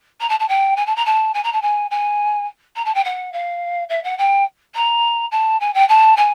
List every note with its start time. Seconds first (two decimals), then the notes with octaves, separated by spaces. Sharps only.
0.20 A#5
0.29 A5
0.39 A5
0.48 G5
0.76 G#5
0.86 A5
0.96 A#5
1.05 A5
1.34 G#5
1.43 A#5
1.52 A5
1.61 G#5
1.90 G#5
2.76 A#5
2.85 A5
2.94 G5
3.04 F#5
3.32 F5
3.89 E5
4.03 F#5
4.18 G5
4.74 A#5
5.31 A5
5.60 G#5
5.74 G5
5.88 A5
6.16 G#5